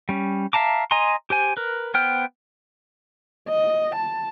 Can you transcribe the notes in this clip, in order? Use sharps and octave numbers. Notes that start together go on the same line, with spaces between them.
G3 C#4
E5 F5 A5 A#5 D6
D#5 G#5 A#5 C6
G4 C5 G#5
A#4 B4
B3 C5 G5 F6
D#5
A5